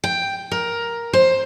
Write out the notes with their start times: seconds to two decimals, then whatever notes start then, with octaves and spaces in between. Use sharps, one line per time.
0.04 G5
0.51 A#4
1.13 C5